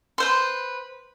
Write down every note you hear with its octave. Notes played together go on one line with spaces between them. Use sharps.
B4 C5 C6